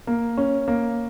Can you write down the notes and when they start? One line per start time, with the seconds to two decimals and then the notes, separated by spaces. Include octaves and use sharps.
0.07 A#3
0.37 C#4
0.68 A#3